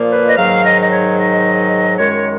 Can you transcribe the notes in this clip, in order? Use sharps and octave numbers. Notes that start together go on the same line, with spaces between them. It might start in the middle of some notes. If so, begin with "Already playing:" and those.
Already playing: A#2 F3 A#3
B4
D#5
G#2 D#3 F#3 F5
D#5
D#5
C#5
D#5
F#2 D#3 G#3 C#5